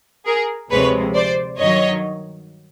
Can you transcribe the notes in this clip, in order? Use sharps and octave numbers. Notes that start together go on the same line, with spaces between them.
G#4 A#4
D2 C3 F3 G#3 B4 C#5
C5 D5
G2 D#3 F#3 C#5 D#5